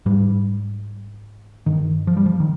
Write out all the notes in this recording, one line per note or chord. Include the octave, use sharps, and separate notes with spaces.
G#2 G3
G2 D#3
F3
G3
F3
D#3